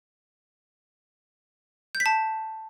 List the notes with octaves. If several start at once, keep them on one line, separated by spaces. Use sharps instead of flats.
G6
B6
A5